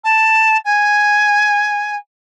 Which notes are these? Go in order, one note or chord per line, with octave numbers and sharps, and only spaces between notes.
A5
G#5